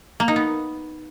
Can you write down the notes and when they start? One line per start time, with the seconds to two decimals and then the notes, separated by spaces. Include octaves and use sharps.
0.20 A#3
0.28 D#4
0.36 B3